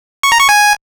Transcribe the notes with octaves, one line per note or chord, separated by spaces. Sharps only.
C#6
A#5
C#6
G#5